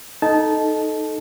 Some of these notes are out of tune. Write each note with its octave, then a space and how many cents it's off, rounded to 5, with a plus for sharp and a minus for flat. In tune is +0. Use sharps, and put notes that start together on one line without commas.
D#4 +0 A4 -15 A5 -15